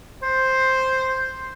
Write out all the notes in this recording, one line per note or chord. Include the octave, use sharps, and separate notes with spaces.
C5